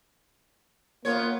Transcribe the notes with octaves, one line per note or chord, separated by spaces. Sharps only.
A#3 B3 F4 C#5